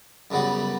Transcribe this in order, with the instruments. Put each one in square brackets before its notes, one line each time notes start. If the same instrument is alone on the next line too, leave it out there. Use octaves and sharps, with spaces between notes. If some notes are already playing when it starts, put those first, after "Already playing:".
[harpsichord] F#2 C#3 G3 B3 F#4